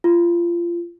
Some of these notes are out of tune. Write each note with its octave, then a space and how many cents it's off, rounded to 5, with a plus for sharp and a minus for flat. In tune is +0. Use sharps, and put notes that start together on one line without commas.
F4 -25